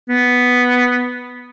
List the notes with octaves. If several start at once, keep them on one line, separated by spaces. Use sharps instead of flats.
B3